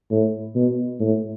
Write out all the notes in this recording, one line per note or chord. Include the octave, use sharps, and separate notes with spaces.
A2
B2
A2